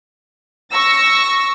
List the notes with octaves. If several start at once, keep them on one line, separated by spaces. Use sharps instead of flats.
C#6 E6 A#6